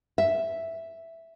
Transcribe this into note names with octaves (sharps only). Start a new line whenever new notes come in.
E5